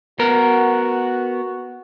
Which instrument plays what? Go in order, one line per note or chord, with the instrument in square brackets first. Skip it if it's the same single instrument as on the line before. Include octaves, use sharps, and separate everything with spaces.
[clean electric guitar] B3 A#4 [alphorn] F#4